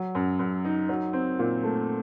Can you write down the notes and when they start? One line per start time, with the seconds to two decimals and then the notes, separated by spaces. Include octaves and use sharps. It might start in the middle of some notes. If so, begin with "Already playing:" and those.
Already playing: F#3
0.15 F#2
0.39 F#2
0.65 D#4
0.89 F#3
1.13 C4
1.39 A#2
1.63 A3